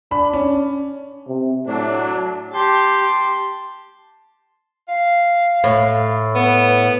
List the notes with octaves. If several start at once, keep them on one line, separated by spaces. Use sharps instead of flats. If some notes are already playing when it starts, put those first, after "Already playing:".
D4 B5
C#4
C3
A2 F#3 D4
G4 A5 C6
F5
A2
B3